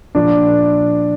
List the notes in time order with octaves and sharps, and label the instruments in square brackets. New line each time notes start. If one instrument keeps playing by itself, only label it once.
[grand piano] A#2 F3 D4